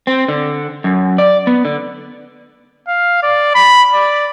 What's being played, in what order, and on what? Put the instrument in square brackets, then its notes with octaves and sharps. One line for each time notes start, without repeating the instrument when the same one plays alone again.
[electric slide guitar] C4
D3
F#2
D5
B3
D3
[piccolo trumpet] F5
D5
B5
D5